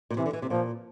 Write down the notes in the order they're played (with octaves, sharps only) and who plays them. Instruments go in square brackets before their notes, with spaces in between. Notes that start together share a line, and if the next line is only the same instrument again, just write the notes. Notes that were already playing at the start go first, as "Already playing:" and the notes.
[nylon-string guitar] A#2
[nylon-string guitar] C3 [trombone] E3
[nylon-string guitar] D3
E3
C3
[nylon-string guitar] A#2 [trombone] F3